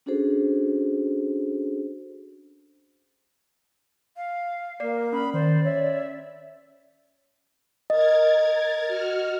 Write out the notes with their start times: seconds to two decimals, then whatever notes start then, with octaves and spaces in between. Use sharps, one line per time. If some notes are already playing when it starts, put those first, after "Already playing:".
0.06 C#4 D4 F#4 G#4 A4 C5
4.17 F5
4.80 A#3 D5 C7
5.13 C#4 B5
5.34 D#3 C5 D5
5.65 C#5 E5
7.90 A#4 D#5 G#6 A6
8.86 F#4 F6